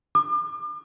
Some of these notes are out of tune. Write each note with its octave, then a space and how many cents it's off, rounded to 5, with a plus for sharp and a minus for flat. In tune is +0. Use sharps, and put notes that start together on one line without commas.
D6 +40